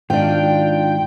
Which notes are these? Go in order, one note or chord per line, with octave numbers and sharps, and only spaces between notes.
G#2 D#3 D4 F4 G5